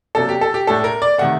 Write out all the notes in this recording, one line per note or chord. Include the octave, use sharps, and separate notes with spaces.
C3 F#3 A#3 D4 A4
G4
A4
G4
A2 A3 D4 A4
A#4
D5
C3 D#3 A3 F#5